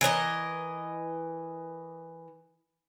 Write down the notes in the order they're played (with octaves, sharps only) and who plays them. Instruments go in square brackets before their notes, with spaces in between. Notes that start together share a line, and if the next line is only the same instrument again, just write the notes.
[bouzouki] E3 A#4 C#5 D#5